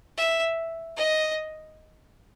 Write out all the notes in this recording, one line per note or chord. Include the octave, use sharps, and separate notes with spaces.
E5
D#5